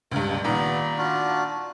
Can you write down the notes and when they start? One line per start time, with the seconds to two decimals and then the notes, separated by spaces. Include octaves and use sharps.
0.12 C#2 G2 A#4 A#5
0.28 G#3 A#3
0.44 A#2 D#3 B3 B5
0.98 D4 F4 F#4